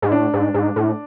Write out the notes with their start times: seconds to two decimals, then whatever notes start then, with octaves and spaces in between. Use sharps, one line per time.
0.02 G#2
0.12 A2 D4
0.33 G#2
0.54 G#2
0.76 A2